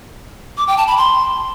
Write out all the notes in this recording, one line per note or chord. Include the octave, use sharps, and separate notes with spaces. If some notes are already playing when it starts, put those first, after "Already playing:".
D6
G5
A5
B5
C6